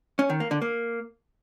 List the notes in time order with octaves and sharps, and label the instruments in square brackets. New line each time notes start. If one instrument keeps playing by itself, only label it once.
[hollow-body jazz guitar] C#4
D#3
A#3
D3
A#3